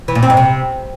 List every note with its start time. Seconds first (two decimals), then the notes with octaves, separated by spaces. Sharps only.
0.08 E3
0.15 A#2
0.23 C4
0.30 G#2
0.37 C3